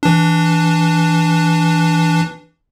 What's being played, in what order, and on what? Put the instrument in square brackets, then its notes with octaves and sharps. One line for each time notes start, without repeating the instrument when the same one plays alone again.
[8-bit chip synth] E3 D4